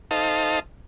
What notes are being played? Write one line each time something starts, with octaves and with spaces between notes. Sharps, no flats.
D#4 A4 C5 D#5 F5 A5